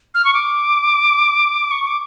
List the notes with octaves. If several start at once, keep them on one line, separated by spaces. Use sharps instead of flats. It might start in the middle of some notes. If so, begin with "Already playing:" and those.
F6
C#6
D6
C#6
D6